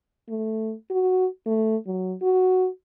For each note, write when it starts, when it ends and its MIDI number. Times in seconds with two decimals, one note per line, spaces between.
0.29 0.73 57
0.90 1.26 66
1.46 1.76 57
1.86 2.15 54
2.22 2.67 66